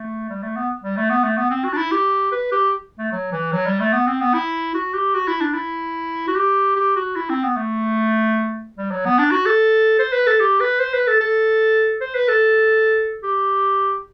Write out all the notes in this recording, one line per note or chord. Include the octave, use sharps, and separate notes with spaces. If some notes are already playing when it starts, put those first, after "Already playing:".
Already playing: A3
G3
A3
B3
G3
A3
B3
A3
B3
C4
F#4
D4
E4
G4
B4
G4
A3
F#3
E3
F#3
G3
A3
B3
C4
B3
E4
F#4
G4
F#4
E4
D4
E4
F#4
G4
G4
F#4
E4
C4
B3
A3
G3
F#3
B3
D4
F#4
A4
C5
B4
A4
G4
B4
C5
B4
A4
A4
C5
B4
A4
G4